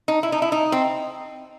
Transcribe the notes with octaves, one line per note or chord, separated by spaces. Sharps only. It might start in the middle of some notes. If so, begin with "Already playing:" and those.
D#4
E4
D#4
E4
D#4
C4